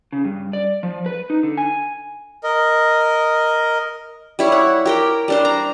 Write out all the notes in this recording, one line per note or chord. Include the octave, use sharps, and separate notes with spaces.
C#3
G2
D5
F3
B4
D#4
D3
G#5
A#4 D#5
G3 E4 C#5
F#5
G4 A#4 G5
G3 D4 C5
A#5